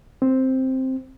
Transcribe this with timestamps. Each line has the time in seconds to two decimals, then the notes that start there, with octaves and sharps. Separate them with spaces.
0.22 C4